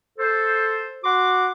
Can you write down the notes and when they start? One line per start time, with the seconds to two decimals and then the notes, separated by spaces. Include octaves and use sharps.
0.19 A4 C5
1.04 F#4 F#5 C6 D6